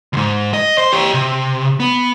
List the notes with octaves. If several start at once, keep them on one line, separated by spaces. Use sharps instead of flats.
D2 G#2
D#5
C5
G4 C#5
C3
B3